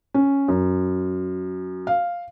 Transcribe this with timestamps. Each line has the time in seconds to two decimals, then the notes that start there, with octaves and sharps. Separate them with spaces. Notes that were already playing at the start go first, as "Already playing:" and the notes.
0.14 C#4
0.48 F#2
1.87 F5